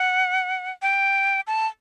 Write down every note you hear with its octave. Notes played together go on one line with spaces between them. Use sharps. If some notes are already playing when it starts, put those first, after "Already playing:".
Already playing: F#5
G5
A5